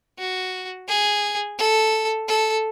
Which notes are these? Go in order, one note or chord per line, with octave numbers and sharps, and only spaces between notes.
F#4
G#4
A4
A4